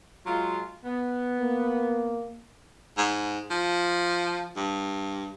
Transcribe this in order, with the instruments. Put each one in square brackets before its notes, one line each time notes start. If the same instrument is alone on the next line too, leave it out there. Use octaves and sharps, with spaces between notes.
[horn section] F#3 G#3 F4
B3
[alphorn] A#3
[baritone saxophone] G#2
F3
G2